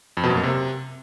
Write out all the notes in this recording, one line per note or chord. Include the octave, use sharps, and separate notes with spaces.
F2
B2
F#2
A#3
C3